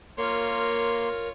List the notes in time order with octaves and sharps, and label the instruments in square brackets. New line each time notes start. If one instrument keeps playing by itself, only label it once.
[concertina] A#3 C6 [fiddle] F4 C#5 [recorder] A#4